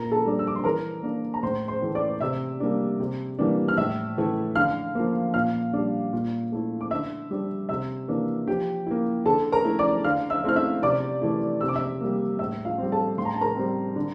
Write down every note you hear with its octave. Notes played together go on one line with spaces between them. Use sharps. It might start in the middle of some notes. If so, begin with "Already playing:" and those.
Already playing: A#2 A#4 A#5
A4 A5
G3 D4
E6
D6
C6
E3 A#4 A#5
A#3 D4
A#5
A2 C5 C6
C5 C6
E3 A3
D5 D6
C3 E5 E6
G3 A#3 D4
C3
E3 G3 A#3 D4
F6
A2 E5 E6
E3 A3 E4
D3 F5 F6
F3 A#3
A#2 F5 F6
G3 D4
A#2
A3 E4
D6
D3 E5 E6
G3 D4
C3 E5 E6
E3 A#3 D4
F3 G4 G5
A#3 E4
D3 A4 A5
A#4 A#5
A3 E4
D5 D6
D3 F5 F6
E5 E6
A3 C4 E4 F6
E5 E6
C3 D5 D6
E3 A3 E4
C3 E6
D6
E5 E6
G3 A#3
A2 E5 E6
F4 F5
G3 C4
A4 A5
A2 C6
A#5
A5
A#4 A#5
G3 C4
D3